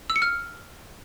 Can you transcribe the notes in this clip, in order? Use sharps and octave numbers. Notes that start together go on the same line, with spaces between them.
E6
C#7
F6